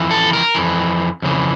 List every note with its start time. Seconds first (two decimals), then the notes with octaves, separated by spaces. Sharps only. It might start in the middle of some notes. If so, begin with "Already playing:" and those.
Already playing: F2 E3
0.11 A4
0.33 A#4
0.55 F2 E3
1.22 F2 C#3 E3